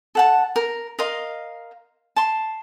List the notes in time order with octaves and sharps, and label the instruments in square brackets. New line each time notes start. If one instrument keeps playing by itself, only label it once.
[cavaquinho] A4 F#5 A5
A#4
A#4 D#5 F5 C6
A5 C6